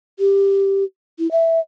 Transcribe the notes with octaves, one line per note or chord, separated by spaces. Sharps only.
G4
E4
E5